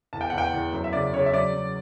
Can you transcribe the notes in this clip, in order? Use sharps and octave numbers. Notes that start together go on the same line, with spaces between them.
E2 A5
G5
E2 F#5
G5
E2
F#2
E5
C#3 D5
C#3 C#5
E5
F#3 D5
F#3